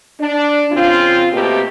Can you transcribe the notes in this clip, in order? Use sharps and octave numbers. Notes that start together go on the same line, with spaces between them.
D4
C#3 C4 F4
B2 A3 A#3 C4 G4